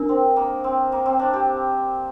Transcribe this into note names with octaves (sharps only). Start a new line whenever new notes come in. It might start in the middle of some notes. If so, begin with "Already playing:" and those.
Already playing: D4 D#4 A#4
C4
A#3
C4
A#3
C4
D4
G4